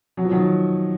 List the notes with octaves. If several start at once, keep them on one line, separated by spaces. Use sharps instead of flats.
F#3
F3
D#3 F#3